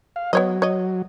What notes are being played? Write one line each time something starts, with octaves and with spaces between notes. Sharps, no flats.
F5
F#3 B3 C#5 D#5
C#5 D#5